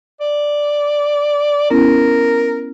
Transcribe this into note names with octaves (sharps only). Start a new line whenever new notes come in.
D5
B3 C#4 E4 A#4